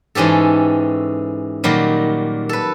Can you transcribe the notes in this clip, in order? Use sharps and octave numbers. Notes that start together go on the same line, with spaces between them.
G#2 E3 C#4 G4 A4
A#2 D#3 F#3 G3
A4 B4